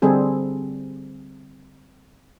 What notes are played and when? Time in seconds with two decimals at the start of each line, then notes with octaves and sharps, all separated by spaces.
0.02 D3 G3 C4 G#4 A4